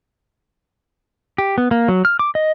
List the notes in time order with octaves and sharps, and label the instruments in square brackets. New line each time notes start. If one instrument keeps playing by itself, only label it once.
[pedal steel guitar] G4
B3
A#3
F#3
F6
D6
D#5